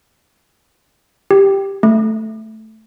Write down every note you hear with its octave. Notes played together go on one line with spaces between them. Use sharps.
G4
A3